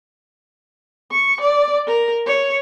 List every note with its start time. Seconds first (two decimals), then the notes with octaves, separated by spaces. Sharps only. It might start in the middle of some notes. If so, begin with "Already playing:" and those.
1.11 C#6
1.41 D5
1.87 A#4
2.27 C#5